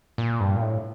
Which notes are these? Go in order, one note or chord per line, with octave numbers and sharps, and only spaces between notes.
A#2
G2
A#2
A2